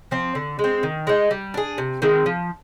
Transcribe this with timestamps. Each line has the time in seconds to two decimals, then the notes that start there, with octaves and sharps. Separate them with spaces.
0.11 F3 C4
0.35 D3
0.59 G#3
0.64 C4
0.83 D#3
1.07 G#3 D#4
1.31 G3
1.54 D4 G#4
1.78 C3
2.02 D#3 G#3 C4
2.26 F3